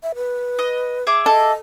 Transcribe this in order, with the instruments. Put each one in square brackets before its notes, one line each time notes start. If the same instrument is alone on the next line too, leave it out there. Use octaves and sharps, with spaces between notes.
[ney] E5
B4
[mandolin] D#5
G#4 E5 D6
[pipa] A4 [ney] D#5